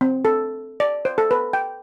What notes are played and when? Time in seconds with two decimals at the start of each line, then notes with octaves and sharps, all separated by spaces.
0.01 C4
0.25 A4
0.80 D5
1.05 C5
1.18 A4
1.31 B4
1.53 G5